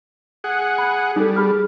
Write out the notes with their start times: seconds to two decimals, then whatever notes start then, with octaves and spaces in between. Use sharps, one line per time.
0.44 G#4 F#5
0.78 B5
1.16 G3 D#4 A4
1.36 G#4 B5 F6